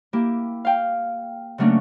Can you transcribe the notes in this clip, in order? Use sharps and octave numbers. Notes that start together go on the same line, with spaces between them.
A#3 E4 G4
F5 G5
C#3 F#3 A3 A#3 C#4 D4